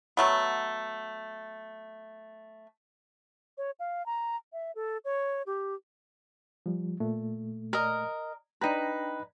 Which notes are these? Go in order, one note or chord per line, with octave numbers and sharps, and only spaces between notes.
F#3 A3 B3
C#5
F5
A#5
E5
A4
C#5
G4
F3 G3
A#2 A3
A#4 D#5
D4 D#4 B4 G5 A#5